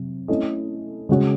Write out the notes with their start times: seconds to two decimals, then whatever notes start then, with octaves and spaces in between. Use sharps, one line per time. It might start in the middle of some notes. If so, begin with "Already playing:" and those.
Already playing: C3 F#3
0.28 A3 C#4 E4 A4 D#5
1.09 C#3 G#3 C#4 F#4 C#5